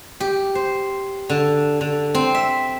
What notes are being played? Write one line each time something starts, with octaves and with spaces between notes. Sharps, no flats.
G4
C5
D3
D3
C4
E5